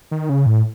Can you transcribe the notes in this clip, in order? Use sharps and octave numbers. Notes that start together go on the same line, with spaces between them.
D#3
C#3
A2